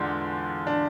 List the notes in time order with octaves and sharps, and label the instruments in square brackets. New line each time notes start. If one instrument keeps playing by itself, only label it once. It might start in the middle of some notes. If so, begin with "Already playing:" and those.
Already playing: [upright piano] E2 D3 G#3 D4 F4
D4